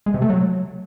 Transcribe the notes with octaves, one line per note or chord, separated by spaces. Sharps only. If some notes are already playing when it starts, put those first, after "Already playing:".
G#3
C3
A3
F#3